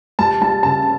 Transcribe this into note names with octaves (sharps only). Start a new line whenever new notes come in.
G3 A5
G3 A5
C#3 A5